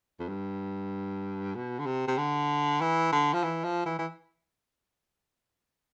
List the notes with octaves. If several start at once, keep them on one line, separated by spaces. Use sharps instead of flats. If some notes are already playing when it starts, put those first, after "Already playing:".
F2
G2
B2
D3
C3
C3
D3
E3
D3
F3
E3
F3
E3
E3